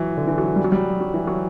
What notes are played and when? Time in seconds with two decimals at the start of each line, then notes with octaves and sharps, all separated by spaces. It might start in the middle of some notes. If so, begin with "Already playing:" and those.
Already playing: E3 F#3
0.17 D3
0.27 E3
0.38 F#3
0.56 G3
0.64 F#3
0.72 G3
1.01 F#3
1.14 E3
1.27 F#3